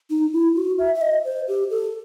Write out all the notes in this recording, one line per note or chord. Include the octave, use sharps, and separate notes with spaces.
D#4
E4
F#4
E5
E5
D#5
C5
G4
A4